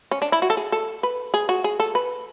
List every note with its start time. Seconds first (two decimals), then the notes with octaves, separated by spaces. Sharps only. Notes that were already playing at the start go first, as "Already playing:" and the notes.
0.11 C#4
0.22 D4
0.32 E4
0.42 F#4
0.50 A4
0.57 G#4
0.72 A4
1.03 B4
1.34 G#4
1.49 F#4
1.64 G#4
1.80 A4
1.95 B4